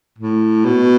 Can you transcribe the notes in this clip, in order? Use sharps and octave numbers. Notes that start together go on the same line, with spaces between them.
A2
B2